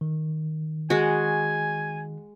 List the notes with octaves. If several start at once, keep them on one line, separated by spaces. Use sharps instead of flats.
D#3
G#3 F#4 G#5